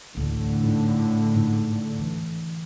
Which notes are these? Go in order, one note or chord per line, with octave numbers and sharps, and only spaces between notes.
A1 D2 A2 D3
G#2 E4
G#2
E3